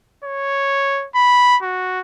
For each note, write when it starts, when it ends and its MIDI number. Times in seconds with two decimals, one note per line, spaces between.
0.24 1.07 73
1.15 1.58 83
1.63 2.00 66